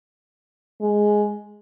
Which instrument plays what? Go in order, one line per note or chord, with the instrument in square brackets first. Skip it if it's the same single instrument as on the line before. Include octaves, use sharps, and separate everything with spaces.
[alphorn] G#3